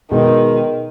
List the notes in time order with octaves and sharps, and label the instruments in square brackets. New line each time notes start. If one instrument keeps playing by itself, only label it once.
[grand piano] B2 G#3 D#4 [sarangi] D#3